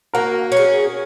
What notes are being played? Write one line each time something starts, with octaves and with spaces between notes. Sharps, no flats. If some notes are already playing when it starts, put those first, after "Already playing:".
A#3 F#4 A#4
C#4
G#4